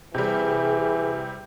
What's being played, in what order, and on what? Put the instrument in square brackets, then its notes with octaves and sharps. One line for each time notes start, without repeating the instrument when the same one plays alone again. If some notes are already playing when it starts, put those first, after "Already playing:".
[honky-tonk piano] C3 G3 [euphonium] E3 [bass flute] G#4